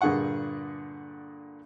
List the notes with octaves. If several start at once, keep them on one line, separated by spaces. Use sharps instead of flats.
G2 A#2 D3 G#4 F#5 C#6